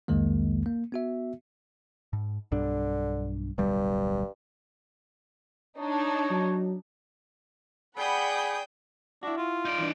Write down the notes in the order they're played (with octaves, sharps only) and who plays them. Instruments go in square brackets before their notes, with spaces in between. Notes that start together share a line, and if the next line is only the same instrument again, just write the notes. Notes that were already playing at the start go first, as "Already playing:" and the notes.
[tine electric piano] C2 F2 D#3 G#3 A#3
A#3
B3 F#4 E5
[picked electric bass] G#2
[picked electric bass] B1 G2 D4 [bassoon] D3
[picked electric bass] D1 B1 G3 [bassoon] G2
[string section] D4 D#4 [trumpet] C#5
[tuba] F#3
[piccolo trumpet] G#4 [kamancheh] D5 [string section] F#5 B5 [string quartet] G5 D#6 G6
[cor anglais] D4 [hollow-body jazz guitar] E4 F#4
[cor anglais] F4
[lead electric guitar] D#4 D5
[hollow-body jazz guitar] E3 D4